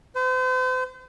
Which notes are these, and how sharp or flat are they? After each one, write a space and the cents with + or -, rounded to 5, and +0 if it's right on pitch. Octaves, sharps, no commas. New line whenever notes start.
C5 -40